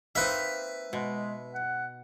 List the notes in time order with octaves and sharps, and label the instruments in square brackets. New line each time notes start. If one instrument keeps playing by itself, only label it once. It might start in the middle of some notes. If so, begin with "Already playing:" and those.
[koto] A#3 C4 D#4 [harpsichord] B4 E5
[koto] B2 [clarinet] G#3
[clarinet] F#5